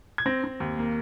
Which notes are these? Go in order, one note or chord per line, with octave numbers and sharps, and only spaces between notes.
G#6
C4 A#6
C4
D#2
A#3